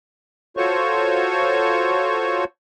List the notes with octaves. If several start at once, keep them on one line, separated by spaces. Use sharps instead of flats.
F4 F#4 A4 C5 C#5 C#6